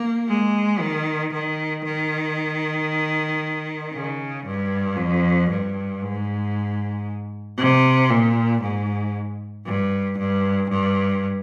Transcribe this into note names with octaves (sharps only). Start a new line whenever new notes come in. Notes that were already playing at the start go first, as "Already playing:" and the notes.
Already playing: A#3
G#3
D#3
D#3
D#3
C#3
G2
F2
G2
G#2
C3
A#2
G#2
G2
G2
G2